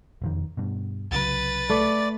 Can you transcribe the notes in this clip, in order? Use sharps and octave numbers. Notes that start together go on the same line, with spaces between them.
E1 F2 D#3
G2 B2
C2 C#3 F#3 B4 A6
A3 D5